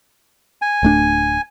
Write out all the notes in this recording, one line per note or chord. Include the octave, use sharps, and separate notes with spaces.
G#5
D1 A3 D4